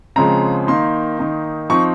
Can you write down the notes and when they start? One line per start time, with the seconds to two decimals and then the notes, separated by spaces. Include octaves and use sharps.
0.16 C#3 F3 G#3 C4 A#5
0.67 D#3 A#3 D#4 C6
1.19 D#3 A#3 D#4
1.70 F3 C4 D#4 C#6